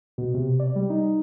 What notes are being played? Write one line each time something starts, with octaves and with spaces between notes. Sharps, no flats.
B2
C3
D5
G3
D#4